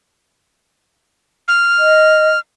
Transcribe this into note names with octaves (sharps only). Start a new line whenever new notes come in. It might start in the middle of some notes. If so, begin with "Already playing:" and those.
F6
D#5